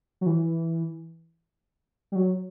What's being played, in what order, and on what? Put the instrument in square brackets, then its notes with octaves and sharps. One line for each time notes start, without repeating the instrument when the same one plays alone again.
[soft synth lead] F#3
E3
G3
F#3